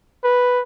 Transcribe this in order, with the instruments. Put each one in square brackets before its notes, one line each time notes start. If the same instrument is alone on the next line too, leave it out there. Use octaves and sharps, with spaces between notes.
[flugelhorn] B4